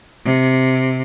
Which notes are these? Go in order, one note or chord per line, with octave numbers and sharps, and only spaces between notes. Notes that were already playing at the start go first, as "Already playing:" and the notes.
C3